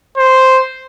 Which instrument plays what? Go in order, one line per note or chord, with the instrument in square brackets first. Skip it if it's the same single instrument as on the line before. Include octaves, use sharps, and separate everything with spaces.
[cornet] C5